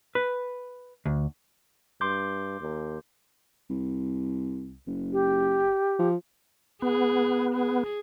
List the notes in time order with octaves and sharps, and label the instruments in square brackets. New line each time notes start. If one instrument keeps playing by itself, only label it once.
[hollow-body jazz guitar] B4
D2
[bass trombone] G2 [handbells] C6 D6 G6
[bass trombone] D#2
[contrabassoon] C2
F#1
[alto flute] G4
[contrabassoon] F3
[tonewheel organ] B3 [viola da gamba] G#4
[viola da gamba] G#4